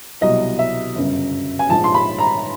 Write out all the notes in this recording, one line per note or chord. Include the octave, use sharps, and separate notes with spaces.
C2 B2 F#3 D#5
E5
G1 F#2 C#3
G#5
A#1 G#2 F3 A5
C6
B5
A#5